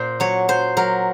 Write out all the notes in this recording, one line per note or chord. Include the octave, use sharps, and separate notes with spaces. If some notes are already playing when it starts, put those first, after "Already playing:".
Already playing: A#2 C5
F#3 C#5
F#3 C5
F#3 A#4